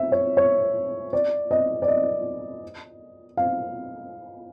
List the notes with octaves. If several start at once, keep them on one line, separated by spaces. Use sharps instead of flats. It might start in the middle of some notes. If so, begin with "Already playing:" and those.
Already playing: E5
C#5
C#5
D5
D#5
D5
D#5
F5